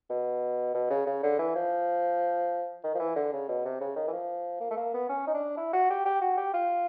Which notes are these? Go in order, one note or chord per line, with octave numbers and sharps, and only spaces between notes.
B2
B2
C#3
C#3
D3
E3
F3
D#3
F3
E3
D3
C#3
B2
C3
C#3
D#3
E3
F3
A#3
A3
A#3
B3
C#4
D#4
D4
E4
F#4
G4
G4
F#4
G4
F4